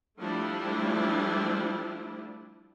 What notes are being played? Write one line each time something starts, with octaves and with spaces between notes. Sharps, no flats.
F3 G3 A3 D4 E4